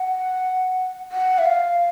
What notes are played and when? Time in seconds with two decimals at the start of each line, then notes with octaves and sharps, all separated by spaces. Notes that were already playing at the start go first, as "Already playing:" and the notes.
Already playing: F#5
1.12 F#5
1.39 E5
1.46 F5